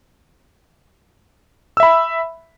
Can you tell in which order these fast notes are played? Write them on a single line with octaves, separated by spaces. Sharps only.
E6 E5 B5